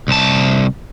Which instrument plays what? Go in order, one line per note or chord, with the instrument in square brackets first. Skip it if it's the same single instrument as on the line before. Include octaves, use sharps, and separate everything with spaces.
[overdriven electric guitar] C2 A5